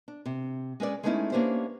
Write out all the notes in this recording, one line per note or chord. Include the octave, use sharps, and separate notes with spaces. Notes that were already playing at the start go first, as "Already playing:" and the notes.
D4
C3
G#3 C#4 B4 D5
G#3 A3 B3 C#4 D#4 E4
A#3 B3 C#4 D4 G4 C5